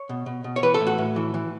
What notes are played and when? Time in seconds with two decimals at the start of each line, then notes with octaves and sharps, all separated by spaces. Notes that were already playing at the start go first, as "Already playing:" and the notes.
Already playing: C#5
0.09 B2
0.26 B2
0.44 B2
0.56 C#5
0.63 E3 B4
0.74 A4
0.80 A2
0.87 F#4
0.98 A2
1.16 E3
1.34 E3